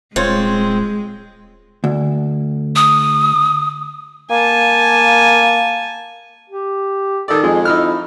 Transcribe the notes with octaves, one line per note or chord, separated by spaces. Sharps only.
D#1 G#3 C4 F4 C#5
D2
D#6
A#3 G#5 A5
G4
D#3 A4 D5
F2 G#3 G#4
D#4 E4 E6 F6